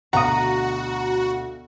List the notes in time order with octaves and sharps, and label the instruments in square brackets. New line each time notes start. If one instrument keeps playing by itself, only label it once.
[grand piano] D2 B2 F5 [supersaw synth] F#4 [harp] F#5 D#6 [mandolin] A#5